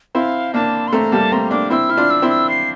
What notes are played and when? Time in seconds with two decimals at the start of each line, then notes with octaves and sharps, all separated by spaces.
0.15 C4 E4 F5
0.54 A#3 D4 A5
0.88 C6
0.93 A3 C4 A#5
1.12 G3 A#3 A5
1.32 A3 C4 A#5
1.51 A#3 D4 D6
1.70 C4 E4 E6
1.89 E4 F6
1.97 D4 F4
2.10 E6
2.22 C4 E4
2.30 E6
2.49 C7